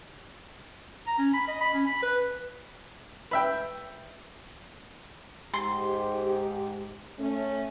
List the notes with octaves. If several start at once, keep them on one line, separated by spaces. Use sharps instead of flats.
A#5
C#4
B5
D#5
B5
C#4
B5
B4
B4 E5 G5
G#2 G4 C6
A3 C#4